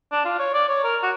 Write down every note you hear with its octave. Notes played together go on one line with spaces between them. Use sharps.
D4
F4
C#5
D5
C#5
A#4
F#4